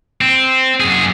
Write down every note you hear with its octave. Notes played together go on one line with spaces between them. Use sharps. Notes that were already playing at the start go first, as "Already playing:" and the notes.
C4
F#2 G#4